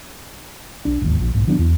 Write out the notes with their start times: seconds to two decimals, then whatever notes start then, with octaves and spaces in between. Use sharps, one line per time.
0.85 B1 D4
1.01 D1 G#1 D#2
1.20 A#1
1.35 B1 G#2
1.47 D#3 F#3 B3 D4
1.59 E2